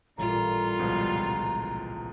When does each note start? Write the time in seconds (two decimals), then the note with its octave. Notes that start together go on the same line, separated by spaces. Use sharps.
0.18 A1 A#2 G3 F4 A#5
0.79 C#2 B2 F3